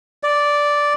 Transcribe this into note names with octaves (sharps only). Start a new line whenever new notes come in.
D5